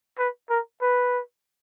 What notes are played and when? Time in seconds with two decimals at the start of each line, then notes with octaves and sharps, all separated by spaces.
0.19 B4
0.50 A#4
0.82 B4